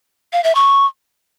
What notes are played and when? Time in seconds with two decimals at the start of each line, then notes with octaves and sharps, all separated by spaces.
0.33 F5
0.44 E5
0.55 C#6